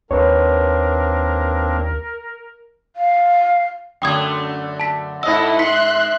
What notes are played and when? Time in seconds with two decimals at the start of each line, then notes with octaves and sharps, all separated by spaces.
0.11 D#2 A#3 C4 D4 A#4 B4 C#5
2.96 F5
4.02 F#2 D3 A3 G5 D#6 G#6
4.80 A5 B6
5.23 G#2 E4 A4 D#5 F#5 E6
5.59 E5 C6 F#6 B6 C#7